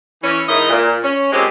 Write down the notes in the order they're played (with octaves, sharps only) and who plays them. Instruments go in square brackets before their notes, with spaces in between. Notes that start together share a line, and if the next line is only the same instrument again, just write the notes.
[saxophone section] E3 C#4
G#2 E3 D#4 E4 A#4 D#5
A#2
C#4
A#2 G#3 C4 G4